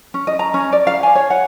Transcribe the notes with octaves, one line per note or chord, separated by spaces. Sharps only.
C#4
D#5
A#5
C#4
D5
F5
G#5
C#5
F#5